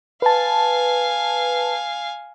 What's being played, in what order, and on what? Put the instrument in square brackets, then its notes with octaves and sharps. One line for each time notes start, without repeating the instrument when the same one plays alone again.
[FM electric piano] B4 A5 [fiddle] F5 G#5